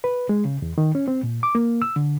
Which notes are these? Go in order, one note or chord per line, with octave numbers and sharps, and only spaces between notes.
B4
G#3
C#3
E2
D#3
C#4
C4
A#2
D6
A#3
E6
D3